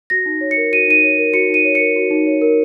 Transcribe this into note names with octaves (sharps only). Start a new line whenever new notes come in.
F#4 A#6
D#4
C#5
C#7
A#4
F#4 D#7
D#4 D#7
C#5
A#4
F#4 C#7
D#4 D#7
C#5
A#4 C#7
F#4
D#4
C#5
A#4